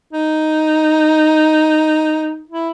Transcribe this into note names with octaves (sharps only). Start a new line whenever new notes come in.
D#4
E4